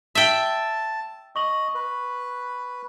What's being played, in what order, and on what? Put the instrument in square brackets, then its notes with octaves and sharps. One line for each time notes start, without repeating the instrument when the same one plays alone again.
[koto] E5 G5 [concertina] A5
[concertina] D#5 [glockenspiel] C#6 F#7
[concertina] B4